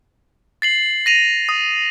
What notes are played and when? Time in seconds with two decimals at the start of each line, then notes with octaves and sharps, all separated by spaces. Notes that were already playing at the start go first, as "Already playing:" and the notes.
0.62 A6 C7 F#7
1.06 A#6 D#7 F7
1.49 D#6